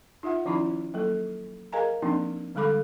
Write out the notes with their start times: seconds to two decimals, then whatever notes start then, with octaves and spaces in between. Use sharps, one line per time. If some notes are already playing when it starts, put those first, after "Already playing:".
0.23 D#4 F4 E5 F#5
0.45 D#3 F3 C#4 D#4 E4 B5
0.94 F#3 A#3 A4
1.72 G#4 A#4 D#5 F5 G#5 A#5
2.02 F3 A#3 C4 D4 D#4
2.55 D3 G3 G#3 A4 B5 D6